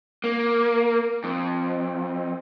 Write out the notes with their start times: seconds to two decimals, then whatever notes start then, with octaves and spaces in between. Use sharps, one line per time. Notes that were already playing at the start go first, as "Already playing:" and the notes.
0.24 A#3
1.24 F2